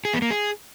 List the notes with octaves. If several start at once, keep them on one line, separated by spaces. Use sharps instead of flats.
G#4
B3
A#3
G#4